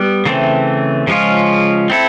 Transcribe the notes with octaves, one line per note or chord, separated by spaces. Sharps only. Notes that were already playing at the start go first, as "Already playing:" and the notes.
Already playing: G3 B3
C#3 E3 A3 C4
C#3 F3 G#3 C#4 F4
C4 E4 A4